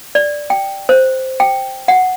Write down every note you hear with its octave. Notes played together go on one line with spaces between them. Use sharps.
D5
G5
C5
G5
F#5